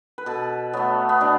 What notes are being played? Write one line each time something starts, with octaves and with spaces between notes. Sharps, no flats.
B4
B2 A4
F#3 A3 B3
B3
B2 D4